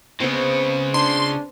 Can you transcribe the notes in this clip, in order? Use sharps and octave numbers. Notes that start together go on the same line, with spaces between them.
C#3 G#3 B3 C4
D4 C6